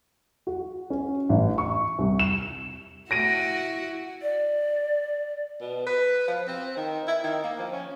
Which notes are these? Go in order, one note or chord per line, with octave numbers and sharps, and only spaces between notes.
F#4
C#4
A1
C#6
C2
E7
E4 F#4 A#6 D7 D#7
D5
B2
B4
F3
C4
D#3
E4
D#3
A#3
F3
C#4